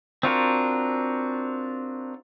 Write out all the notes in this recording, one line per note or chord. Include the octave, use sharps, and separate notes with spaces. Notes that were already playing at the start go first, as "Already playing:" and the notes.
C4 D4 F4 F#4 A#4